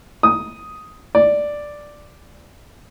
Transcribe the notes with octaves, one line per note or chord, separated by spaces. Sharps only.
D#6
D5